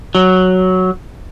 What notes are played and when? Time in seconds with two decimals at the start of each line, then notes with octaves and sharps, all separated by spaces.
0.15 F#3